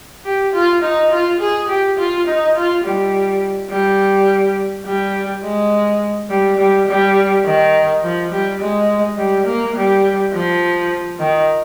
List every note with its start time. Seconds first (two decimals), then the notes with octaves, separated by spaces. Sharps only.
0.24 G4
0.53 F4
0.82 D#4
1.11 F4
1.40 G#4
1.68 G4
1.98 F4
2.27 D#4
2.55 F4
2.84 G3
3.70 G3
4.86 G3
5.43 G#3
6.30 G3
6.58 G3
6.88 G3
7.45 D#3
8.03 F3
8.31 G3
8.61 G#3
9.17 G3
9.46 A#3
9.76 G3
10.33 F3
11.20 D#3